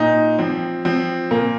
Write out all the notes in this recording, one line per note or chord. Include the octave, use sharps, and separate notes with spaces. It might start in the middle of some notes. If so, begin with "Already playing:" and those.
Already playing: A#2 D#4
F3 C4
F3 C4
A#2 A#3